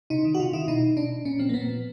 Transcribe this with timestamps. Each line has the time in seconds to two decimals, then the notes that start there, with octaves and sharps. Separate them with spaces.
0.10 C3 D#4
0.25 D#3
0.34 F#4
0.40 C3 F4
0.53 D#3 E4
0.68 B2 D#4
0.97 B2 D4
1.25 A#2 C#4
1.39 F3 C4
1.49 A#3
1.54 A#2 B3
1.68 F3